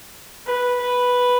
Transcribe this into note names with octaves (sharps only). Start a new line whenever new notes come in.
B4
B4